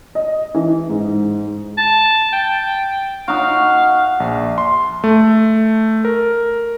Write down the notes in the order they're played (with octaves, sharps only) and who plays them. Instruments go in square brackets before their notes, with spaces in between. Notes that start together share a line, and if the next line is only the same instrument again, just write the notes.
[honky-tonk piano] D#5
E3
G#2
[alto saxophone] A5
G5
[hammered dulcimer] D#4 F#4 [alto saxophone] F5
[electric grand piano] A#1
C6
A3
A#4